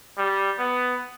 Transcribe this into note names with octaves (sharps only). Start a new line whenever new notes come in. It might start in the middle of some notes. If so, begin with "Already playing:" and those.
G3
B3